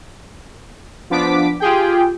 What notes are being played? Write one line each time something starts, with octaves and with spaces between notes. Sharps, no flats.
F3 B3 D4 D6 B6
F4 G4 G#4 G5